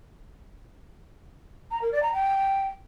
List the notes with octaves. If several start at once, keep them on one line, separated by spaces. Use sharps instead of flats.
A#5
A#4
D5
A#5
G5